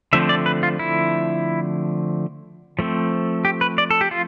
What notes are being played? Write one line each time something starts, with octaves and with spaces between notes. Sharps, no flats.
D3 F3 A3 C4 E5
D5
B4
F4
E4
F3 A3 C4
G4
B4
D5
A4
G4
F4